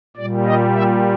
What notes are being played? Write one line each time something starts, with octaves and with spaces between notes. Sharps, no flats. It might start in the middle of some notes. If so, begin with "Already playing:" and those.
A#2 G3 D5
D#5
E5